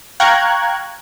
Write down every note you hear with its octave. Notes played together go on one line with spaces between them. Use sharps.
F5 G5 A#5 C#6 F#6 G#6